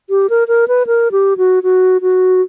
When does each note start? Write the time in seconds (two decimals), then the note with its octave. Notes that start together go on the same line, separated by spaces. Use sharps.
0.10 G4
0.30 A#4
0.48 A#4
0.68 B4
0.87 A#4
1.12 G4
1.37 F#4
1.63 F#4
2.02 F#4